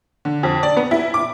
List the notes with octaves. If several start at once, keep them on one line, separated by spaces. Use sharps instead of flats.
D3
F2
D5
B3
E4
D6